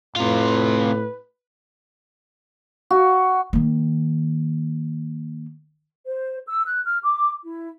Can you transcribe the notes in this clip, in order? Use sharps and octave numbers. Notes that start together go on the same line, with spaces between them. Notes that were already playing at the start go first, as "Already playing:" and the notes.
A2 C3 F4 B4
F#4
D#3 A#3
C5
E6
F#6
F6
D6
E4